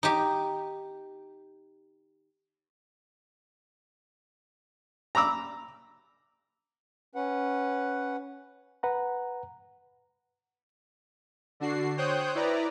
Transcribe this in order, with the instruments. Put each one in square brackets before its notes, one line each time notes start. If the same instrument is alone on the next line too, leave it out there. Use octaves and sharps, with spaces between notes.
[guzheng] D#4 G4
[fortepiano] A#5 B5 D6 E6
[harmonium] C#4 B4 F#5
[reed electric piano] B4 F#5 A#5
[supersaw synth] D3 D4 F#4 C7
C5 C#5 G5 D#6 F#6 G6
E4 B4 D5 A#5